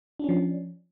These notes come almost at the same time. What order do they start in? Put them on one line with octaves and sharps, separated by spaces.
D4 C#4 F3